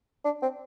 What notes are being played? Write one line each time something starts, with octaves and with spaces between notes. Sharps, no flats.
D4
C4